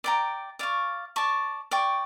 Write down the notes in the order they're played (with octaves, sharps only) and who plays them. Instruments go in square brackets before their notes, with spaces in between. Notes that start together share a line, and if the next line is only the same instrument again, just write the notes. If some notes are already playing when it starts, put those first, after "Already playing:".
[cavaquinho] D5 G5 A#5
D5 F5 C#6
D5 A5 C#6
D5 G5 C#6